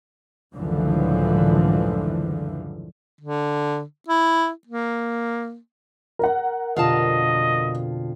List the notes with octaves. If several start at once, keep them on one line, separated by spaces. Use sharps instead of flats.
C#2 F#2 A2 D3 E3 F3
D3
E4
A#3
A#4 F#5
F2 B2 D3 F4 D#5 F5 A5